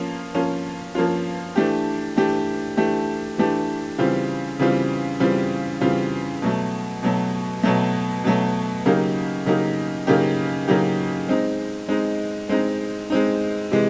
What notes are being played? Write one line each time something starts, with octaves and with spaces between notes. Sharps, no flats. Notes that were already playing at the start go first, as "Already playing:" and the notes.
Already playing: F3 A#3 C#4 F4
F3 A#3 C#4 F4
F3 A#3 C#4 F4
E3 A3 D4 G4
E3 A3 D4 G4
E3 A3 D4 G4
E3 A3 D4 G4
C#3 E3 G3 C4 F4
C#3 E3 G3 C4 F4
C#3 E3 G3 C4 F4
C#3 E3 G3 C4 F4
B2 F#3 A3
B2 F#3 A3
B2 F#3 A3
B2 F#3 A3
C#3 F#3 A#3 D#4 G4
C#3 F#3 A#3 D#4 G4
C#3 F#3 A#3 D#4 G4
C#3 F#3 A#3 D#4 G4
G#3 C4 D#4
G#3 C4 D#4
G#3 C4 D#4
G#3 C4 D#4
C3 E3 G#3